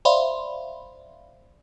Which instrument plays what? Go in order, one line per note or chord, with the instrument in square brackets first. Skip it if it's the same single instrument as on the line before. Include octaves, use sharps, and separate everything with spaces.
[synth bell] C5 D5 E5 F5 B5 C6